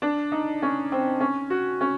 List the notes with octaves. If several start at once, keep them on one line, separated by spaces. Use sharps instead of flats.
D4
D#4
C#4
C4
C#4
F#4
C#4